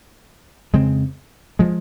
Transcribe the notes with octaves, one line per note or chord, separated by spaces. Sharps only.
F2 C#3 G#3 C4
F3 G#3